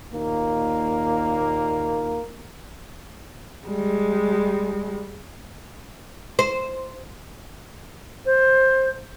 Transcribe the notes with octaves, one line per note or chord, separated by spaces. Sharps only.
D#2 A#2 A#3
G3 G#3
C5
C5